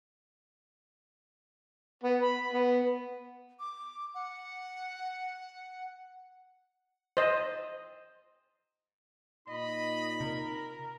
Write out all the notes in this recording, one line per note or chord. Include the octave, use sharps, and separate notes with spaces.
B3
B5
B3
D6
F#5
C5 D#5
A#2 D#4 D#5 B5
C3 A#4